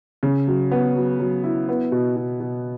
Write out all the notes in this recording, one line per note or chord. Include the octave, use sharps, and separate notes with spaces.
C#3
F#3
B3
F#3
F#3
E4
B3
B2
B2
B2